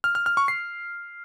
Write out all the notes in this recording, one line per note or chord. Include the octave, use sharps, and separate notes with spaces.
F6
F6
F6
C#6
C7